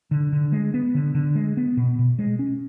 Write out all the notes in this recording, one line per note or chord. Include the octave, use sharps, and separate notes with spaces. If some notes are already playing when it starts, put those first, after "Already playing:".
D3
D3
G#3
B3
D3
D3
G#3
B3
B2
B2
G#3
C#4